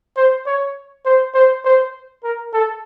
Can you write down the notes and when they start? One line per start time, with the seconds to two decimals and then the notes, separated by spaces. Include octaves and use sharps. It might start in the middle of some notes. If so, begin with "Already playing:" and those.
0.16 C5
0.46 C#5
1.05 C5
1.34 C5
1.64 C5
2.24 A#4
2.53 A4